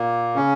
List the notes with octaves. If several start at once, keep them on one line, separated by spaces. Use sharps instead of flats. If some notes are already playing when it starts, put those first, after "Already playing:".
Already playing: A#2 A#3
C#3 C#4